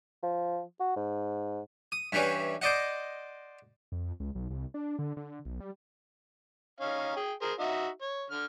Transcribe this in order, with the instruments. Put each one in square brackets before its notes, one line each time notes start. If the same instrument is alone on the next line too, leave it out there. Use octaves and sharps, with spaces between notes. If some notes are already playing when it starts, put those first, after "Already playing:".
[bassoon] F3
F#4
G#2
[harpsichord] D#6
G2 E3 G3 C#4
C5 D5 D#5 F#5
[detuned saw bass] F2
C#2
B1
C2
D4
D3
D3
B1
G3
[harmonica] C#4 D#4 F5
G#4 G5
G#4 A#4 C5
D#4 F#4 E5
C#5
D3 F6